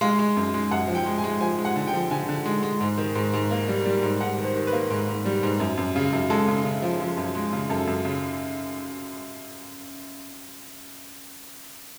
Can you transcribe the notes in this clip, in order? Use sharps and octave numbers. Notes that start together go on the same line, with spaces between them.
G#3 F5
G#3
F#2
G#3
F#2 F#5
F3
G5
G#3
G#5
G#3
F3 G#5
G#3
F#5
D3
G5
F3
D3 G#5
D3
G#3
G#3
G#2
D#3
G#2
G#2
A#3
G3
G3
G#2
G#2 F#5
D#3
C5
D#3
B4
A#3
G#2
G#2
G3
G#2
F#2
F#2
C#3
F#2
G#3 A4
C#3
C#3
F3
F3
F#2
G#3
C#3
F#2 A4
F#2
C#3